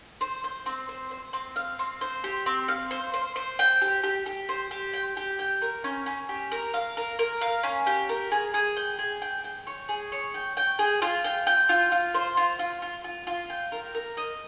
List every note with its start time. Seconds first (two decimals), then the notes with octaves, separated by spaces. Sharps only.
0.21 C5
0.44 C5
0.66 C4
0.89 C5
1.11 C5
1.33 C4
1.56 F5
1.79 C4
2.01 C5
2.24 G4
2.46 C4
2.68 F5
2.91 C5
3.14 C5
3.36 C5
3.59 G5
3.82 G4
4.03 G4
4.26 G4
4.49 C5
4.71 G4
4.93 G5
5.17 G4
5.39 G5
5.62 A#4
5.84 C#4
6.06 C#4
6.29 G4
6.52 A#4
6.74 F5
6.97 A#4
7.19 A#4
7.41 F5
7.63 C#4
7.87 G4
8.09 A#4
8.32 G#4
8.54 G#4
8.77 G5
8.99 G#4
9.22 G5
9.44 G5
9.67 C#5
9.89 G#4
10.12 C#5
10.34 G5
10.57 G5
10.79 G#4
11.02 F4
11.24 G5
11.47 G5
11.69 F4
11.92 F4
12.14 C5
12.37 F4
12.59 F4
12.82 F4
13.04 F4
13.27 F4
13.50 G5
13.72 A#4
13.95 A#4
14.17 D#5